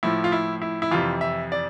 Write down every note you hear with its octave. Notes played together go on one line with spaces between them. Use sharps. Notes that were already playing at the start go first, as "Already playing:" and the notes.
A2 F3 E4
F4
E4
E4
E4
F2 C3 E3 F4
E5
D5